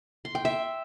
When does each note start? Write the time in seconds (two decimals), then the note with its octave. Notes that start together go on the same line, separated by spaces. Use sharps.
0.25 C6
0.35 G5
0.45 E5